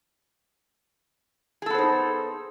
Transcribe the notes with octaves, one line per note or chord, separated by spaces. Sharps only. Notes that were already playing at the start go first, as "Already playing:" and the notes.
B3 D#4 G#4 A4 C5